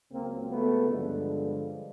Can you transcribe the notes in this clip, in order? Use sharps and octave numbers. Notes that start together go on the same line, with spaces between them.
C#2 C#3 F#3 A#3 C4
A3 B3
G2 D3 F3 G#3